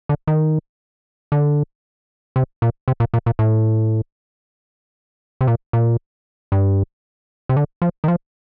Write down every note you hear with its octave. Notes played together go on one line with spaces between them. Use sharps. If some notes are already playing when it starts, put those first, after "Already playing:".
D3
D#3
D3
C3
A#2
C3
A#2
A#2
A#2
A2
C3
A#2
A#2
G2
C3
D3
F3
D#3
F3